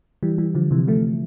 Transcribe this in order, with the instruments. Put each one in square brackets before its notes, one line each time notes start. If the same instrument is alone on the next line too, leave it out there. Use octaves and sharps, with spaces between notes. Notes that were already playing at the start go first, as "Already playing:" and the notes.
[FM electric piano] E3 G3
E3 G3
D3 F3
C3 E3
F3 A3